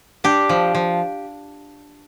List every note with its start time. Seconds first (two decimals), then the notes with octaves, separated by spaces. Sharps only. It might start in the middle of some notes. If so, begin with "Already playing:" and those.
0.24 D4 G4
0.49 F3
0.75 F3